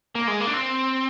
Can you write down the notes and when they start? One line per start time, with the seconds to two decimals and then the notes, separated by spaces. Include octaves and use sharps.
0.15 A#3
0.28 G#3
0.40 A#3
0.47 D4
0.54 C4